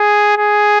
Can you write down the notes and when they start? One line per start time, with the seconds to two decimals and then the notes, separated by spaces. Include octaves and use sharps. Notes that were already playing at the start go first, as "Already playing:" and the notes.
Already playing: G#4
0.37 G#4